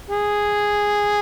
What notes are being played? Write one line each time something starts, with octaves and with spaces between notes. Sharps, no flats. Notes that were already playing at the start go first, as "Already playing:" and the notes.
G#4